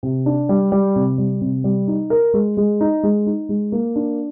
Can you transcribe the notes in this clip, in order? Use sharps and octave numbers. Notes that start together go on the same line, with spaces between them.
C3
D4
G3
G3
C3
G3
C3
G3
D#4
A#4
G#3
G#3
D#4
G#3
D#4
G#3
A#3
D4